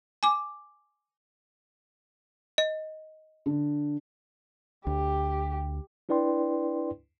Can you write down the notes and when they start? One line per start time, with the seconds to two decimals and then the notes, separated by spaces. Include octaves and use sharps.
0.23 G#5 D6
2.58 D#5
3.46 D3
4.87 D2 G4
6.09 D4 E4 B4 D5 G5 C6